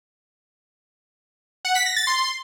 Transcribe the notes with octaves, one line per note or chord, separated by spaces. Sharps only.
F#5
B6
A#6
A6
C6